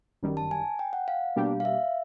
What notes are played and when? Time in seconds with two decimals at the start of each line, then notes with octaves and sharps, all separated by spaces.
0.23 G1 F#2 D#3 G3
0.37 A5
0.51 G#5
0.79 G5
0.93 F#5
1.08 F5
1.36 B2 G3 A#3 D4 G4
1.60 F5
1.65 E5